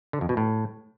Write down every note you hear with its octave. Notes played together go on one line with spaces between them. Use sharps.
D3
F2
B2
A2